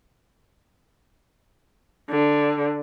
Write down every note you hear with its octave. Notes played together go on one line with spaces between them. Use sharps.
D3